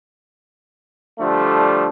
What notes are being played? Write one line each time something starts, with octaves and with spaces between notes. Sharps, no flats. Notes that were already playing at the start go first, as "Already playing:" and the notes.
D3 F3 G3 A3